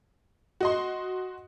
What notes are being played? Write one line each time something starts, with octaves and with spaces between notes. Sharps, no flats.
F#4 D#5 C6